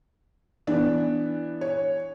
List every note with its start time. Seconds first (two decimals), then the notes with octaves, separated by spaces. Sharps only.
0.67 E3 B3 D4
1.61 C#5